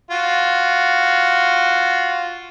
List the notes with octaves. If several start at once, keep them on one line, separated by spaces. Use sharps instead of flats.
F4 F#4